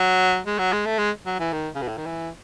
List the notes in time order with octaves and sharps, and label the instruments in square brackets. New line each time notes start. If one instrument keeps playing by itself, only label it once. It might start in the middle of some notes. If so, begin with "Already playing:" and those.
Already playing: [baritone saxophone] F#3
G#3
F#3
G#3
A3
G#3
F#3
E3
D#3
C#3
B2
A2
D#3
E3